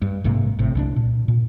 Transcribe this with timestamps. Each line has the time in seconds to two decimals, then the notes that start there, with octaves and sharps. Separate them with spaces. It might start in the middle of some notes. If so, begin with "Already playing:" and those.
0.02 G2
0.24 A#1 G#2 C3 A#3
0.59 G#1 A2 C3
0.75 C2 F3 D4
0.96 A#2
1.28 A#2